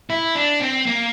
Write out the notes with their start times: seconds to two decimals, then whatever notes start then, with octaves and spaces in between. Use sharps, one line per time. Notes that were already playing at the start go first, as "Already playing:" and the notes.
0.10 E4
0.35 D4
0.60 C4
0.86 A#3